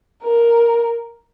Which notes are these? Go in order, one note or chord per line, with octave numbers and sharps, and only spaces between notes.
A#4